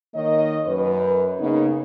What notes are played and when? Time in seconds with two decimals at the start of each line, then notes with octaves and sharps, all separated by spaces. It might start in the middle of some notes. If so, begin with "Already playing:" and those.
0.15 D#3 A#3 C#5 D#5
0.66 F#2 B4
1.40 C#3 A#3 B3 D#4